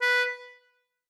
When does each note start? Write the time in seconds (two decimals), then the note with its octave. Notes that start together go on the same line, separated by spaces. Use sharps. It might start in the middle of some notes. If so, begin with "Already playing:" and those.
0.02 B4